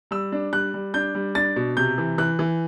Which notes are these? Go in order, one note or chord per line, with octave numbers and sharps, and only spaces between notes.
G3 E6
D4
G3 F#6
G3
D4 G6
G3
D4 A6
B2
C3 G6
E3
E3 F#6
E3